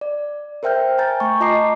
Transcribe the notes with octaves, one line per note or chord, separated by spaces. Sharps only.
D5
A#4 C5 E5 G5 F6 G6
G5 G#5 A#5 G6 A6
A3 C#6
F4 D#5 A5 A#5 D6 C7